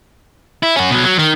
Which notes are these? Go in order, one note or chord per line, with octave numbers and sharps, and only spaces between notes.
E4
C#4 F#4
B2 F#3
F#3
D#3